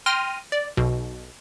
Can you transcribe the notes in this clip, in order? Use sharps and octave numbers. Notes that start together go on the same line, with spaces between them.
G5 C6 F6 A#6 D#7
D5
B1 B2